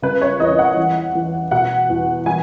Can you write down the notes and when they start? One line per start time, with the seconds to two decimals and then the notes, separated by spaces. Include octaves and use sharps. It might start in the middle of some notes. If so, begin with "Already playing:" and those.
0.02 C#3 B4
0.21 C#5
0.40 E2 D#5
0.59 F#5
0.77 E3
1.15 E3
1.51 B2 F#5
1.90 E2
2.26 E3 G#5